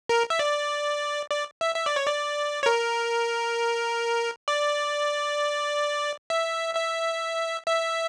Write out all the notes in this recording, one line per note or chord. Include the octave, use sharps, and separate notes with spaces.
A#4
E5
D5
D5
E5
E5
D5
C#5
D5
C#5
A#4
D5
E5
E5
E5